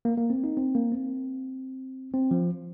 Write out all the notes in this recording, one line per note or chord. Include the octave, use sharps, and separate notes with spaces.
A#3
A#3
C4
D#4
C4
A#3
C4
C4
F3